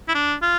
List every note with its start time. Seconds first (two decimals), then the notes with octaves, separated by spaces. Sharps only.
0.09 E4
0.15 D4
0.42 F4